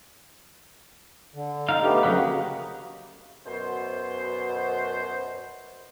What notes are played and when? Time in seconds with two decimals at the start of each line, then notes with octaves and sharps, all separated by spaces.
1.34 D3
1.69 D#4 F5
1.83 A3 B3 G4
2.03 C#3 F#3 A#3 D#4 B4
3.46 F#2 B2 C5